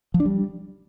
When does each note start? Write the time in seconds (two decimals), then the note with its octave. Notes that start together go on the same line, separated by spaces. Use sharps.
0.14 F3
0.20 D4
0.25 G3